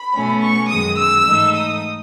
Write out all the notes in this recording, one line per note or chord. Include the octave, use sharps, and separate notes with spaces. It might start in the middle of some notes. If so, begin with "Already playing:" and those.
Already playing: B5
B2 A3 C#4
C#6
F#2 D#3 G#3 D#6
E6
G#2 E3 A3 D#4
D#6